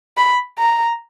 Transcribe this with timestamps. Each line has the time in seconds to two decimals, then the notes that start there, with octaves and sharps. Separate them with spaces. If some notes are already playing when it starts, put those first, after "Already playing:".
0.17 B5
0.58 A#5